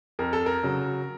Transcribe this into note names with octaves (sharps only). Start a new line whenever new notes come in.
F2 A#4
A4
A#4
C#3 F#3